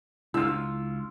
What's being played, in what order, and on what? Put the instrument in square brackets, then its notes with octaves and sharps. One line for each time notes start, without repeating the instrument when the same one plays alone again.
[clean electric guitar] C#2 F4 [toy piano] D4 E4 [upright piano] E6